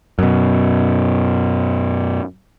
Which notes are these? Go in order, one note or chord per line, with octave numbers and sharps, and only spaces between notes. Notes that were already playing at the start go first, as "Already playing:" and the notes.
F#2 B2